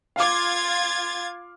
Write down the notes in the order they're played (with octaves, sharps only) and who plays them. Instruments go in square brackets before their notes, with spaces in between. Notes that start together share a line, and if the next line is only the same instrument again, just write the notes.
[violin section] F4 G#6 A6 [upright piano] F5 D6